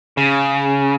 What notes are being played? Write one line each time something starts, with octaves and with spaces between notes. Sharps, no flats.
C#3